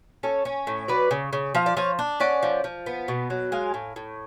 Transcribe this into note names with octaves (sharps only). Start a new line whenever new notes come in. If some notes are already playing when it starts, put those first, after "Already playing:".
C#4 A4 C#5
C#4
A2
F#3 B4 D5
C#3
C#3
F3 F5
D5
F3 C#5 F5
D4
C#4 D5 F#5
F3
F3
B3
B2
F#3
G#3 F5 G#5
A2
A2